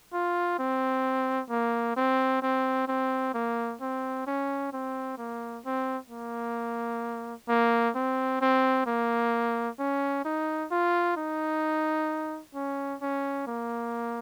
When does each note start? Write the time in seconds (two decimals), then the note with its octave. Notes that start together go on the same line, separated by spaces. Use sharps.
0.13 F4
0.59 C4
1.50 A#3
1.96 C4
2.42 C4
2.88 C4
3.34 A#3
3.81 C4
4.27 C#4
4.73 C4
5.18 A#3
5.65 C4
6.10 A#3
7.49 A#3
7.95 C4
8.41 C4
8.86 A#3
9.79 C#4
10.25 D#4
10.71 F4
11.17 D#4
12.54 C#4
13.02 C#4
13.47 A#3